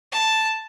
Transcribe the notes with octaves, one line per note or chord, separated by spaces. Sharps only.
A5